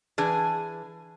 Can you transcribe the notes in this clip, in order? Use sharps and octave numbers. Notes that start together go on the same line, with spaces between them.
E3 D4 G#4